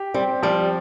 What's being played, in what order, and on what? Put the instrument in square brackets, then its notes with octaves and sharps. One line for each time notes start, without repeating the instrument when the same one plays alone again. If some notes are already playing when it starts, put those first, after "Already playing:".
Already playing: [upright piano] G4
[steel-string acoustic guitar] G3 [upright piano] C4
[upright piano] F3 [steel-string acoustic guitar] G3